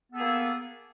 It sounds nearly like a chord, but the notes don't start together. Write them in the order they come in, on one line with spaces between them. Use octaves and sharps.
B3 A4 G#4 A#3